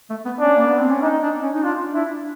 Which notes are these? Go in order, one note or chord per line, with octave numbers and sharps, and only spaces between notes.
A3
B3
C#4 D4
A#3
B3
C4
C#4
D4 D#4
D4
C#4
D#4
D4 F4
D4 E4